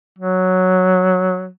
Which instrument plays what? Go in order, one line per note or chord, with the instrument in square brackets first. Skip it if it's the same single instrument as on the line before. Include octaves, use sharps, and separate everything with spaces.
[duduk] F#3